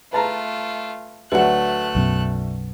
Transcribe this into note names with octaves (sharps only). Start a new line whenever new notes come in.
A3 F4 B4 A5 A#5
D2 F#3 A3 B4 F#5 F#6
B1 F#2 B2